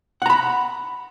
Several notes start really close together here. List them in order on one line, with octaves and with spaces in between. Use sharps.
F#5 A#5 B5